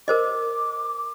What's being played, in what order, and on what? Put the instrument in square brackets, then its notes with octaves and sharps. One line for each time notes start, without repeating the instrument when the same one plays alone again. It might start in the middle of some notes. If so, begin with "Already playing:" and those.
[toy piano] A#4 C5 D#5 [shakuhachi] D6